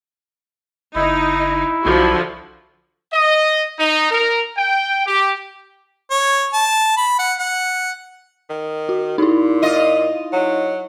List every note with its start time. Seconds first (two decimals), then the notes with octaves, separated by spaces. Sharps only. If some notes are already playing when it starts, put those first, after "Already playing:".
0.95 F#1 D#4 E4
1.86 B1 D3 F3 F#4
3.13 D#5
3.78 D#4
4.11 A#4
4.57 G5
5.07 G4
6.11 C#5
6.53 A5
6.97 B5
7.19 F#5
7.39 F#5
8.50 D#3
8.89 F#4
9.18 A#2 D#4 E4
9.62 F4 D#5
10.32 F#3